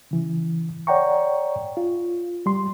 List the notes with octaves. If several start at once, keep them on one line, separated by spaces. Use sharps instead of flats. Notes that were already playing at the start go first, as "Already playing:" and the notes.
C#3 E3
C#5 D5 F#5 G5 A#5 C#6
F4
G3 C6